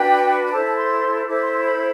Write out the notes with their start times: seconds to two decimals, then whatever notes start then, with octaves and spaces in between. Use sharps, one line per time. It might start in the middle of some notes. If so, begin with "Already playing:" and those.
Already playing: D4 F#4 B4 G5
0.42 B5
0.52 E4 A4 C5 A5
0.64 A5
0.77 C6
1.27 E4 A4 C5 D6
1.39 C6
1.52 C6
1.64 B5